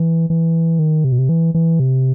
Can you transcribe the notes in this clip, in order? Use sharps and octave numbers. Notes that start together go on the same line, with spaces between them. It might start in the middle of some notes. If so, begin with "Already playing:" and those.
Already playing: E3
E3
D#3
C3
B2
C3
E3
E3
C3